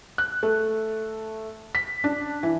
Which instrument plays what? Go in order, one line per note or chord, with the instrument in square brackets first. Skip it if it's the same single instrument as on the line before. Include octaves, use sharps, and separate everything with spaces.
[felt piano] F#6
A3
B6
D4
E3